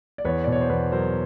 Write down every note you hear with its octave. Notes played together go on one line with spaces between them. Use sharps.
D5
E2 B4 C#5
B2 D5
C#5
C5
E2 B4
F#3 A#4 C5